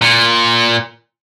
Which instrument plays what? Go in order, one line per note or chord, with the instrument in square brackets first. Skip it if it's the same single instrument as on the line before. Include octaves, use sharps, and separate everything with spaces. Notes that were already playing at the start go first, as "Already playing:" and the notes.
[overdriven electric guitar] A#2